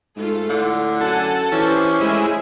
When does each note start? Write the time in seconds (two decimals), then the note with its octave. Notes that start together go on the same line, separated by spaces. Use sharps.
0.16 G#2 A3 F4 A4
0.50 A2 D3
1.01 F#2 A4 F#5 G#5
1.52 E3 C#4 G4 C5
2.01 A2 G#3 E4